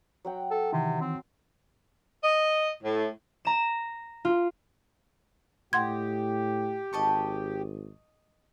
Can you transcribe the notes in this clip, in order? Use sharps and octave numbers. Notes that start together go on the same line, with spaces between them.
F#3 F#5 G5
A4
C3 D#3 E3
C4
D#5
A2
A#5 E7
F4
A2 G4 D#5 F#5 C6 G#6
G#1 D#5 A5 C#6